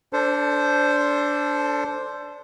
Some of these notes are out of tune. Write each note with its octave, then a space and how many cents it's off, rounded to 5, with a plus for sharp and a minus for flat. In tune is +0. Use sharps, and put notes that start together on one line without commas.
D4 -15 A4 +25 C5 +0